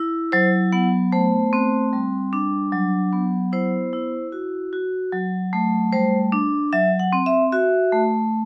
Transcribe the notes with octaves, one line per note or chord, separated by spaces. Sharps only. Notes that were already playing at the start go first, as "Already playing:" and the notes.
Already playing: E4
F#3 C5
B3 F#5
A3 C5
C4
G3
D4
F#3
B3
E4 C5
E4
F#4
F#4
F#3
A3
G3 C5
D4
F#3 E5
F#5
C4
E5
F#4 E5
A3